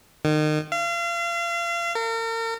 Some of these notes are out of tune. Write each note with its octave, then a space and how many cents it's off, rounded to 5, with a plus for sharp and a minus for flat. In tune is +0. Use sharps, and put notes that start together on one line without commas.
D#3 -30
F5 -35
A#4 -40